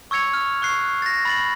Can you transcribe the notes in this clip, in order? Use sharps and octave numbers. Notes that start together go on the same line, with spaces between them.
C#6 E6 G#6 C#7 F7
F6
C#6 F#6 C7
A6 A#6
B5 A6 F#7